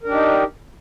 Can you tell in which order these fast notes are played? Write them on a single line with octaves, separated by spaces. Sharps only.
A#4 D4 G4 D#4